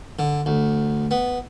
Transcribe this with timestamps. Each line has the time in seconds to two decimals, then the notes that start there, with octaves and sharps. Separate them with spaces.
0.19 D3
0.46 D2
1.11 B3